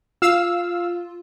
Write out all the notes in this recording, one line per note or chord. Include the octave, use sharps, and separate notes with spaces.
F4 F5 E6